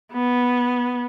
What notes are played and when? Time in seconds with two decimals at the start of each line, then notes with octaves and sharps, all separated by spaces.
0.13 B3